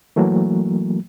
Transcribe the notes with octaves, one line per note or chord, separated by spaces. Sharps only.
E3 F#3 A3 A#3